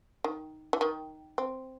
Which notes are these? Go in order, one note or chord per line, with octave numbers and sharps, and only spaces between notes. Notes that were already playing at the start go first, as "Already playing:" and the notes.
D#3
E3
D#3
C4